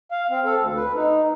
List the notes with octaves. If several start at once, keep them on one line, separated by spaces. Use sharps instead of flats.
F5
C4
A4
D2
B4
D#4